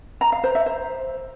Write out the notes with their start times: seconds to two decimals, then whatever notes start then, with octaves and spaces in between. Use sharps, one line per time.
0.21 A#5
0.32 F5
0.44 C5
0.55 E5
0.66 C5